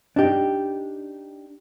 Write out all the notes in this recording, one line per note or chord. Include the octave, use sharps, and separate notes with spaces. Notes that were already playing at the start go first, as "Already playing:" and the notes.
D4 D#4 G4